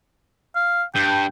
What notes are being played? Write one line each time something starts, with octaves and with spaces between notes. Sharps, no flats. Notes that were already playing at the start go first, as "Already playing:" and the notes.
F5
G2 G5